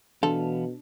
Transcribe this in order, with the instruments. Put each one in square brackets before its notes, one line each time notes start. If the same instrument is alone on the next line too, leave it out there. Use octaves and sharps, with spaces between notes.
[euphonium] B2 [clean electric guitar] E3 B3 F5 [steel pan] D4 [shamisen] A4